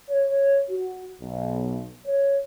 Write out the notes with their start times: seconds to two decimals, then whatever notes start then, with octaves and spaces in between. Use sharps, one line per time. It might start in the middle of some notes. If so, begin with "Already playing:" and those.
0.10 C#5
0.70 F#4
1.21 B1
2.07 C#5